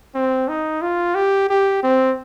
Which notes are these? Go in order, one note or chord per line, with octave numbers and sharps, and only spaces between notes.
C4
D#4
F4
G4
G4
C4